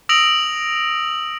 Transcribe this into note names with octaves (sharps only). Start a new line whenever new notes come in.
D#6 E6 A#6 D7 F7 F#7